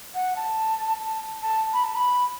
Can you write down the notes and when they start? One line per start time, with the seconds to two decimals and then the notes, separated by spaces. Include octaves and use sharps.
0.15 F#5
0.36 A5
1.00 A5
1.42 A5
1.73 B5
1.84 A5
1.95 B5